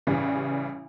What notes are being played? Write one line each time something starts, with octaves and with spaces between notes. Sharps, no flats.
A1 C#3 E3 G3